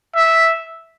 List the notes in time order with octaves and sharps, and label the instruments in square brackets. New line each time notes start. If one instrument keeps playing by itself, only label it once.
[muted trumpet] E5